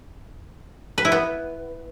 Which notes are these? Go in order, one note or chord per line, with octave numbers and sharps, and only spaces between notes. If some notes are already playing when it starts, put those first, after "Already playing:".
B4
E4
B3